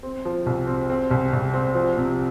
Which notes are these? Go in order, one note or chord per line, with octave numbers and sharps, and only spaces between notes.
C4
F3
C2
C4
C4
C2
C2
C4
F3
C3